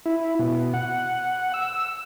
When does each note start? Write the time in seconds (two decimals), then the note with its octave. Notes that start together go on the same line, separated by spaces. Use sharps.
0.06 E4
0.39 B2
0.73 F#5
1.54 E6